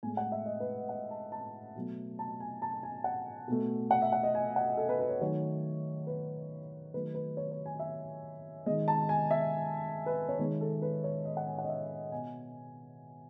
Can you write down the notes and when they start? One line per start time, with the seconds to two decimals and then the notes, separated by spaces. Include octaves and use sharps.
0.03 A2 G#3 G#5
0.17 F#5
0.32 E5
0.46 D#5
0.60 B4
0.89 F#5
1.11 A5
1.32 A5
1.76 B2 F#3 A3
2.19 A5
2.40 G#5
2.62 A5
2.83 G#5
3.04 F#5
3.48 B2 A3
3.91 F#5
4.02 E5
4.12 F#5
4.23 D#5
4.35 G#5
4.56 F#5
4.77 A4
4.89 B4
5.00 B4
5.09 C#5
5.21 D#3 F#3 A3 C#5
6.07 B4
6.94 D#3 F#3 A3 B4
7.15 B4
7.37 C#5
7.52 C#5
7.66 G#5
7.79 E5
8.66 G#3 D#5
8.70 D#3
8.88 A5
9.09 G#5
9.31 E5
10.06 B4
10.29 C#5
10.39 D#3 G#3 C#5
10.61 A4
10.82 B4
11.04 C#5
11.25 D#5
11.37 F#5
11.47 G#5
11.58 F#5
11.65 D#5
11.69 E5
12.12 B2 G#5